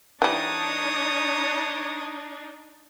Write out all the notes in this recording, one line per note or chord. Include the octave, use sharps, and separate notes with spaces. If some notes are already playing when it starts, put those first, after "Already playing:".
E3 G3 D4 D#4 C#5 D#6